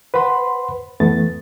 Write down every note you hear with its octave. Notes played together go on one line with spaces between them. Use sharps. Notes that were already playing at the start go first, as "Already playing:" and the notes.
B4 C5 F#5 B5 C6
F2 E3 A3 B3 A6